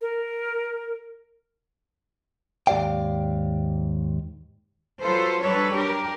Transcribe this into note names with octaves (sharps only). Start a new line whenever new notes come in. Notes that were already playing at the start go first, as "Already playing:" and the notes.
A#4
D#2 G#2 G4 D5 F5 G5
F#3 F4 A4 B4 C5
F#3 G3 D4 A4 B4 C#5
D4 G4 A#4